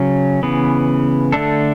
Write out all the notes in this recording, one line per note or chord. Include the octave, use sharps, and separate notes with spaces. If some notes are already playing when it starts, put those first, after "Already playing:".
Already playing: C#3 F#3 C#4
C#3 E3 B3
D3 A3 D4 A4